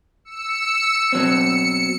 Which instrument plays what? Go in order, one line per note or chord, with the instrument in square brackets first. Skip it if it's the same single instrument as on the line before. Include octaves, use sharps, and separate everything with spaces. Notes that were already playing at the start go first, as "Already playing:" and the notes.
[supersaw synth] E6 C#7
[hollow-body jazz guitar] B2 F#3 C4 [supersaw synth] C#7